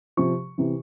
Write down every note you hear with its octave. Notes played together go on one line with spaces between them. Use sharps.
C3 F3 C#6
C3 E3